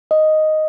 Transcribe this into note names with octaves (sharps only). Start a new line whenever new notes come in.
D#5